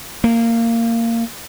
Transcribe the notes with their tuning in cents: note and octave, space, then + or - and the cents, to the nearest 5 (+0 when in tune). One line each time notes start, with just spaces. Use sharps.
A#3 -20